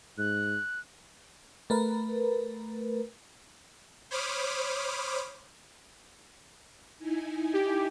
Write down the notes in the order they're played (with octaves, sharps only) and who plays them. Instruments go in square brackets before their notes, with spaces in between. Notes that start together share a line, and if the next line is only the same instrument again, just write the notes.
[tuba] G#2 [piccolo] F#6
[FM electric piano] A3 A#4 B4
[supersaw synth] C5 C#5 B5 D6 D#6 F6
[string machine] D#4 E4 G#5
[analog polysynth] G4